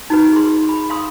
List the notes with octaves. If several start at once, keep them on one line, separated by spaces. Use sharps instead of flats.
D#4 F#4 B4
G#4 C6
B5
F5 C6 D#6